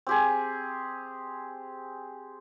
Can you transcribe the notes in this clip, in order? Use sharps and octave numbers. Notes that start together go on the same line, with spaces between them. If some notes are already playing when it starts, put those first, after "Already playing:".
C4 G4 G#4